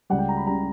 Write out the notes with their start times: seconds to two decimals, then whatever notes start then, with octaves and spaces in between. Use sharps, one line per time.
0.10 C#2 C#3 G3 F#5
0.19 G5
0.29 A#5
0.37 B5
0.47 C#3 G3 A#5